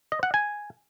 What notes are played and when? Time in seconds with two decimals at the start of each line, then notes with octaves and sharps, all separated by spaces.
0.12 D#5
0.23 F#5
0.34 G#5